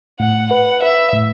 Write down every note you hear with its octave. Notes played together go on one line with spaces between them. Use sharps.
A2 F#5
B4 F#5
B4 E5
A2